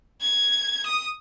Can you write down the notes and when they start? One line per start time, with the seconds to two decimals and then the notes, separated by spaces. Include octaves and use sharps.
0.21 G#6
0.86 D#6